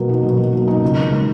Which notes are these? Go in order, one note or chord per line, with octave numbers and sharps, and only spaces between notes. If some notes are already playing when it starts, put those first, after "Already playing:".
Already playing: B2 F#3 A#3
D#4
B2
F#3
A#3
D#4
C#2
C#3
G#3